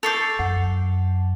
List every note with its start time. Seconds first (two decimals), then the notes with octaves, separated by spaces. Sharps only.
0.03 A4 C#6 D6 G6 C7 F7
0.39 F#2 F#5